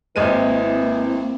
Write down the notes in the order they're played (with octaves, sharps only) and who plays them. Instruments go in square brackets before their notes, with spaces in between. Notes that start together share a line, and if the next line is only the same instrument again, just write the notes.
[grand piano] G#1 G#3 D#7 [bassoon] E3 [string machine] A#3 C4 E4